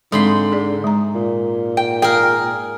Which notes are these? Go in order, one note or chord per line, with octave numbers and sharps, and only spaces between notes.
G#2 D3 G#3 C4 B5 C6
G#4 A4 D5
G#3 A#5
A#2
G5
G#4 A#4 G5